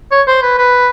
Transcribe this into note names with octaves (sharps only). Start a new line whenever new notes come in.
C#5
C5
B4
B4